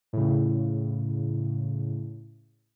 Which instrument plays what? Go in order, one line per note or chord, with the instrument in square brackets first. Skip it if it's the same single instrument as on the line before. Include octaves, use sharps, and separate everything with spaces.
[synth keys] A2 C#3